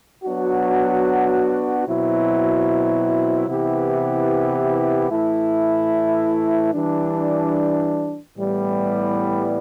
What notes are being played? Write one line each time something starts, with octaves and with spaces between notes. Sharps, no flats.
F#3 B3 D4 F#4
B2 F#3 C4 E4
C3 E3 B3 E4 G4
A2 E3 A3 E4
E3 G3 D4
A2 E3 G3 B3